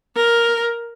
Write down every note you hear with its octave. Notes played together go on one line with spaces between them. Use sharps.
A#4